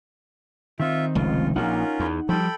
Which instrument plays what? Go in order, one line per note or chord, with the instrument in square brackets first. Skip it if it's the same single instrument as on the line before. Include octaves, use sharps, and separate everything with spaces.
[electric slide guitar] D#3 C4 D#4 [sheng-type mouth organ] F4 E5
[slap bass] F1 C#2 [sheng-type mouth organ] F4
[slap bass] A#1 [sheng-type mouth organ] C#4 F4 A#4 [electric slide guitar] D#4 F#5
[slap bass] E2
[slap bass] F3 G3 [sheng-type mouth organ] A4 G5 B5